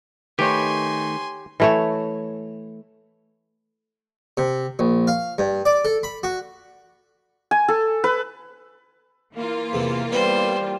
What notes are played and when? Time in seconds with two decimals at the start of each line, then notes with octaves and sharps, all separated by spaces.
0.39 D#3 A3 D#4 G4 B4 C#5 G#5 C6
1.60 E3 A3 C#5
4.37 C3
4.79 A#1
5.07 F5
5.38 G2
5.66 D5
5.85 A4
6.03 B5
6.23 F#4
7.51 G#5
7.68 A4
8.04 B4
9.34 E3 A#3 F4
9.73 E2 C3
10.12 G3 B3 C5